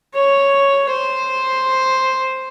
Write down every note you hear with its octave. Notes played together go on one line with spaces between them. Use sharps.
C#5
C5